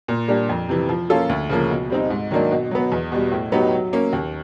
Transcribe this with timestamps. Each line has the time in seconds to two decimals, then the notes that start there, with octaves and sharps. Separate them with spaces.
0.08 A#2
0.28 G3 A#3 D4 G4
0.49 F2
0.69 C3 E3
0.89 F3
1.10 A#3 C#4 F4 A4
1.29 D2
1.49 C#3 F3 A#3
1.70 B2
1.90 G3 C4 D#4
2.10 G#2
2.31 D#3 F#3 A#3 D4
2.51 B2
2.71 F#3 B3
2.92 E2
3.12 B2 G3
3.32 A2
3.52 F#3 B3 D#4 G4
3.72 F#3
3.93 A#3 C#4
4.13 D#2